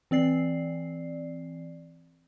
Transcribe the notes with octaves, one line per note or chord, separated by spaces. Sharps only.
E3 C4 D5 C7